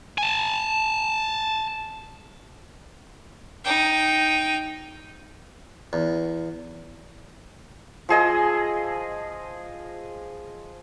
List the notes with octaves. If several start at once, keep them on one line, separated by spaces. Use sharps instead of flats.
G#5 A5
D#4 G5
E2
F3 G#4 D#5 E6